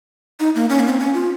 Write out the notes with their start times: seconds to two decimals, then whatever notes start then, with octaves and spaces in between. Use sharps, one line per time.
0.40 D#4
0.55 A#3
0.70 C#4
0.80 A#3
0.89 C4
1.00 C#4
1.14 F4